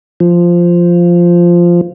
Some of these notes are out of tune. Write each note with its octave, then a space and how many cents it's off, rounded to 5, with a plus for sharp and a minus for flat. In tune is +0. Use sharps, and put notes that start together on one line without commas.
F3 -5